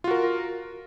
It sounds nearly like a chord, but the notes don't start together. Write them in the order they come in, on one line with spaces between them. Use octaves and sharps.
F4 F#4 A#4